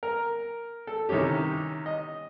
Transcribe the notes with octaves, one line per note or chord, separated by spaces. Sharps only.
A#4
A4
C3 D#3 E3 C#4 G4
D#5